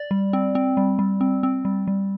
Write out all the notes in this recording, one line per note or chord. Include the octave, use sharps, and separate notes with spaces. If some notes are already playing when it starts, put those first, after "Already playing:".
Already playing: D5
G3
C4
C4
G3
G3
C4
C4
G3
G3